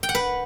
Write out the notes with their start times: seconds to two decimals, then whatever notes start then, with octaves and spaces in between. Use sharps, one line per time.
0.03 G5
0.09 F#5
0.15 B4